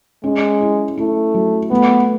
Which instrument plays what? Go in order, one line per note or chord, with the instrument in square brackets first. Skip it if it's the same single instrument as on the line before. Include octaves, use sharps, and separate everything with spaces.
[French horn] G#3 [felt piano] C#4
[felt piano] E4
[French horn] A3 [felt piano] E4
[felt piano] F#3
[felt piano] A3 [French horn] B3